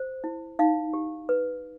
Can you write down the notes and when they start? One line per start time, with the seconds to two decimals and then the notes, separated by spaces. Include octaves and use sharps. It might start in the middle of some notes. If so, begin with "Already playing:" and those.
Already playing: C5
0.24 E4
0.59 D#4 F5
0.93 G4
1.29 B4